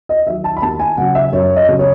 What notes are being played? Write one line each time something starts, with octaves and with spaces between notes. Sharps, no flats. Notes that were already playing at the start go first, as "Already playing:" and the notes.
D#5
D#3 F#3 E5
A5
B5
D#2 A5
G#5
C#3 F#3 F#5
E5
F#2 C#5
D#5
C#3 F#3
C#5